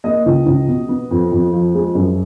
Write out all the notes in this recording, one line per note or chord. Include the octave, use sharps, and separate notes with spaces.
A#3 D#5
C#2
C#2
B2
B3
F2
F2
F3
G#3
F#2